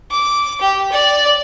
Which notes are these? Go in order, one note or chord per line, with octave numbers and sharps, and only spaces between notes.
D6
G4
D5